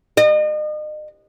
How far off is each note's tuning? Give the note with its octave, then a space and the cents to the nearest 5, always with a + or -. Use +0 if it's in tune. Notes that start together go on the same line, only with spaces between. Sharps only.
D#5 -40